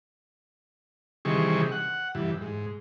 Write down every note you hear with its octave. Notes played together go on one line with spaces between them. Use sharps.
C3 D#3 E3 G3 G#4 C#6
F#5
G2 E3
G#2